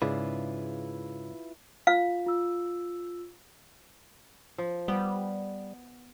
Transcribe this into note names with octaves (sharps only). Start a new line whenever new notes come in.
G#2 C#3 E4 F4 B4 D5
F4 F5
F4 E6
F3
G3 B3